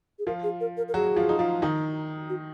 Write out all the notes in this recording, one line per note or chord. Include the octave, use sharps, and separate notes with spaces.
G#4
F3 F4 A#4
G#4
A#4
A#4
A#4
F#3 F#4 G#4
F3 F4
D#4
F3 F4
D#3 D#4
F#4